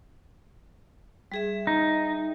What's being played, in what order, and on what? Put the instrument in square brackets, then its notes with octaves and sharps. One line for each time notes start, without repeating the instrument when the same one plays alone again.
[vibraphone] G3 G#4 E5
[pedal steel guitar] D#4